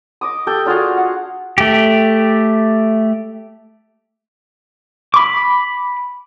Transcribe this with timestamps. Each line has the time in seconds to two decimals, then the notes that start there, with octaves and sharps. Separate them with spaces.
0.21 D#5 D6 D#6
0.47 G4 A4 G5
0.66 D4 F4 F#4 G#4
0.97 F#5
1.58 A3 G4
5.14 B5 D6